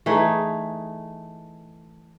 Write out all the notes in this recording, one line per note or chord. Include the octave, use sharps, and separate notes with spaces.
E3 A3 D#4 G#4